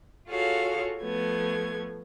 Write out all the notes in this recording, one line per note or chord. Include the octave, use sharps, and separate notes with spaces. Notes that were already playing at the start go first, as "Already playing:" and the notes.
F4 F#4 G#4 A4 C#5 F5
F3 A3 B3 G#6